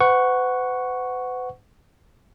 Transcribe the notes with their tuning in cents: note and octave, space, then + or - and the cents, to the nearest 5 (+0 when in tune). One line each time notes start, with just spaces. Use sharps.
B4 +45 F#5 +0 C#6 +0